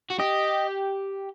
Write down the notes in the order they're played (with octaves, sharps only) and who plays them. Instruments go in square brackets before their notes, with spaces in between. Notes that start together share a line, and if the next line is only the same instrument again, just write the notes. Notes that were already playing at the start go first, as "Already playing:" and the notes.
[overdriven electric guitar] F#4
[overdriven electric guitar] G4 [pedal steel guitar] D#5